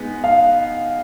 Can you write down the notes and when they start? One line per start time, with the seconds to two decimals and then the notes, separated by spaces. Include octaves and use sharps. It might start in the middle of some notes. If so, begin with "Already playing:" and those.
Already playing: G#3 B3 D#4
0.24 F5